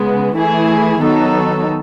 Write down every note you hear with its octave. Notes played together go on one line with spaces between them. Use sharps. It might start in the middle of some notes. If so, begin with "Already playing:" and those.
Already playing: C#3 G#3 B3
E3 A3 E4 G#4
D#3 F#3 B3 D#4 A4